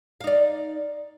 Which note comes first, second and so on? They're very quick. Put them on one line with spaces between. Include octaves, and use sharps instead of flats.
F5 D#4 D5